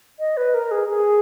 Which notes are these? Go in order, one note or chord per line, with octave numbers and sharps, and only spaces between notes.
D#5
B4
A#4
G#4
G#4